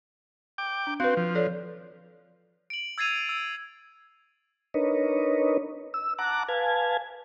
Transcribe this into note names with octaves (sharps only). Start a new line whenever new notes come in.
G5 D6
D4
C4 F#4 B4 F5
F3
A4 C#5 D5
D7 F#7
E6 G#6 A6 C7 D#7 F7
E6
D4 D#4 A#4 B4 C#5 D#5
E6
F#5 A5 A#5 D6 F#6
B4 F5 G#5 A5 G#6